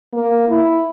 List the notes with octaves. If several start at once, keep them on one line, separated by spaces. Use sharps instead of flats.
A#3
E4